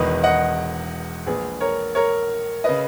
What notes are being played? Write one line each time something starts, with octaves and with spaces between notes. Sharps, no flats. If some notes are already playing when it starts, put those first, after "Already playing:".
Already playing: E1 E2 D#3 B4 D#5
D#5 F#5
A#1 A#2 G#4 B4
A#4 C#5
A#4 C#5
C#3 B4 D#5